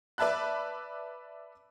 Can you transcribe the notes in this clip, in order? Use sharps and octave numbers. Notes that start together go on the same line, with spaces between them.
B4 D5 E5 A5 B5 F#6